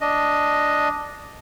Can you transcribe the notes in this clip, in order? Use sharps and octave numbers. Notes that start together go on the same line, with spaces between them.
D4 D#5